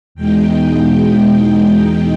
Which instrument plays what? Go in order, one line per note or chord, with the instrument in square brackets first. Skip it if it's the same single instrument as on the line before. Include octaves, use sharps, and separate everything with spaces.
[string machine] E2 B2 G#3 D#4 G5